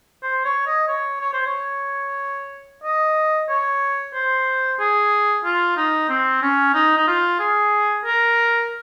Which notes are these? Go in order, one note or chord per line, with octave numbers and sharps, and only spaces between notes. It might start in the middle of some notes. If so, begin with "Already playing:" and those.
C5
C#5
D#5
C#5
C#5
C5
C#5
D#5
C#5
C5
G#4
F4
D#4
C4
C#4
D#4
D#4
F4
G#4
A#4